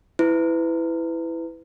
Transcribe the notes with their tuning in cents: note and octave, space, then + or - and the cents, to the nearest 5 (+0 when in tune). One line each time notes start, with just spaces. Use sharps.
E4 +0 B4 +25